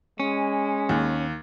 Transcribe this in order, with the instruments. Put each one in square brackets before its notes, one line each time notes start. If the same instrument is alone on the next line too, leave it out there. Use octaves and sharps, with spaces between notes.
[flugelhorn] G#3 [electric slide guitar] C#4
[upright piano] D#2